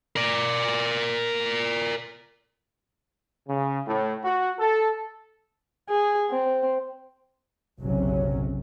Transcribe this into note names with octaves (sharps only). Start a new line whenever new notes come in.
A#4 D5
C#3
A2
F#4
A4
G#4
C4
F#1 B1 C3 F#3 C#4